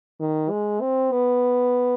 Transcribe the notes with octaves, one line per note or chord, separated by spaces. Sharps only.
D#3
G#3
C4
B3